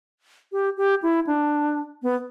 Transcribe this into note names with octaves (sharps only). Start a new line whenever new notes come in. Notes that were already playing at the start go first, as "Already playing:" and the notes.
G4
G4
E4
D4
B3